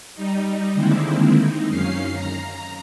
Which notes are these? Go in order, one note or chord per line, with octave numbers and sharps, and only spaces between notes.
G3 D#4
D3 D#3 G#3 A#3 C4 E4
D#4
F#2 C#4 F5 C7
A#5